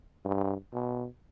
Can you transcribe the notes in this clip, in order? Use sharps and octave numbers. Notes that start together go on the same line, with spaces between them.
G2
B2